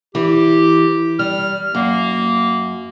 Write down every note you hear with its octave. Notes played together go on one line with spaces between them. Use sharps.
E3 G4
G3 F6
F#2 A#3